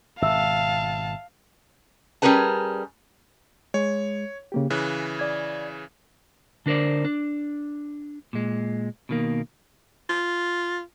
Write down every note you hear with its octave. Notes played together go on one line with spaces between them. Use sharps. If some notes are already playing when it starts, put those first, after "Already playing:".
G#1 B2 E5 F5 A5 E6
G3 C#4 G#4 A#4 B4 A5
G#3 C#5
C#3 A#3 G4
C#3 E3 F#6
D5 G#6
D3 D4 A#4 C5 D5
D4
A#2 G#3
B2 D#3 A#3
F4